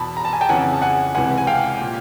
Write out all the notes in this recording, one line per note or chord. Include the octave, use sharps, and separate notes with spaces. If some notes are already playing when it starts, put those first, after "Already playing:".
Already playing: E2 B2 A5 B5
A#5
A5
G#5
G5 A5
F2 C#3 E3 F#5 G#5
A5
F#5 G#5
C#2 C3 E3 F#5 G#5
G#5
F5 G5
A#2